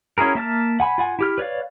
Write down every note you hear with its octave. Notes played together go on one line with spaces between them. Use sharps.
C#4 E4 F#4 G#4 A#4
A#3 E5 A5 F6
F#5 G#5 B5
F4 F#5 G#5
E4 G4 F6
B4 C#5 D5 F5